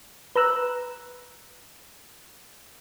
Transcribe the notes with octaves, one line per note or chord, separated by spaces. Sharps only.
B4 A#5 E6 F#6